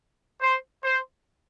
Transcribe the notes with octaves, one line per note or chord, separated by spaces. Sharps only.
C5
C5